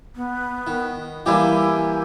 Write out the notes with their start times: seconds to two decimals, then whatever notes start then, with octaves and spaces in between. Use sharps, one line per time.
0.16 B3
0.67 D#3
1.26 E3 G3 A#3 D4 E4 G4 G#5